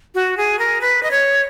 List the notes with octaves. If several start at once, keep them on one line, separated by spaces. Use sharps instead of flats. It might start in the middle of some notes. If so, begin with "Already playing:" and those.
F#4
G#4
A#4
B4
D#5
C#5